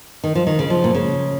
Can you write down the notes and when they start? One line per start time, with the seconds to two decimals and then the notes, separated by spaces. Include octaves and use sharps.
0.24 D#3
0.35 F3
0.47 D#3
0.59 C#3
0.70 F3
0.84 A#2
0.95 C#3